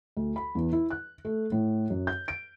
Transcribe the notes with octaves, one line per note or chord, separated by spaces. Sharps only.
D2
B5
E2
E4
F#6
A3
A2
F#2
G6
D7